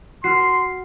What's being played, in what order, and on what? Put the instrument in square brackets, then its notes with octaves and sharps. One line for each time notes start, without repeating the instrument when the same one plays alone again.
[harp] F#4 F6 [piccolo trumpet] C6 [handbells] C7